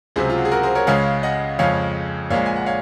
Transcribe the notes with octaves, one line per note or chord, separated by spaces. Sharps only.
C#2 C3 F#3 G#4 C5
F4
F#4
G#4
F#4 A#4
G#4 C5
A#4 C#5
C#2 C#3 G#3 C#5 F5
D#5 F#5
F2 C#3 F3 G#3 C#5 F5
A#1 A#2 G#3 C#5 F5
G#5
F#5
C#5 F5